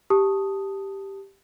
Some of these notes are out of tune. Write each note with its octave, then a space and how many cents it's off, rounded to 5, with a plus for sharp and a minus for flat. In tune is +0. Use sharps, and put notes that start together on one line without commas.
G4 +0 A5 +0 D#6 +0